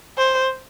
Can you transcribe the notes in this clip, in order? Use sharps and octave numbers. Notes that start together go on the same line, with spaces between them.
C5